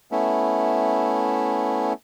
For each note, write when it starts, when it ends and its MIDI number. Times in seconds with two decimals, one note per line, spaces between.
0.11 1.93 57
0.11 1.93 59
0.11 1.93 61
0.11 1.93 64